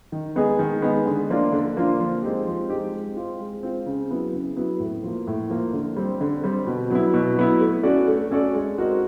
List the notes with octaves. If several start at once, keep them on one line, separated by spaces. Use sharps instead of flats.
D#3
G#3 B3 D#4 G#4
D#3
G#3 B3 D#4 G#4
D3
F3 A#3 D4 F4
D3
F3 A#3 D4 F4
F3
G#3 C4 D#4 G4
F3
G#3 C4 D#4 G4
G#3
C4 F4
G#3
C4 F4
C#3
F#3 B3 E4
C#3
F#3 B3 E4
A2
F3 A#3
A2
F3 A#3
D3
G3 C4
D3
G3 C4
B2
F#3 B3 E4
B2
F#3 B3 E4
A3
C#4 F#4 A4 D5
A3
C#4 F#4 A4 D5
G#3
C4 D#4 F#4 A#4